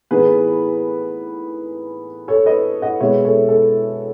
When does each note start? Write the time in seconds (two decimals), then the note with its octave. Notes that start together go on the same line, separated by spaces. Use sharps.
0.11 A2 E3 B3 D#4 G#4 B4
2.28 A4 C#5
2.46 B4 D#5
2.82 D#5 F#5
3.00 B2 G#3 B3 C#5 E5
3.25 A4 C#5
3.49 A4